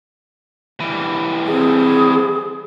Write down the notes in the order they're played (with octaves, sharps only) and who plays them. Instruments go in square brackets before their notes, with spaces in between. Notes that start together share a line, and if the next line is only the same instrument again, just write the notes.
[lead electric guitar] E3 G3
[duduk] C4 [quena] G#4